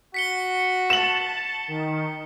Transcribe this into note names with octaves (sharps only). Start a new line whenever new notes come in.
F#4 B6 C#7 G7
A5 E7 F#7
D#3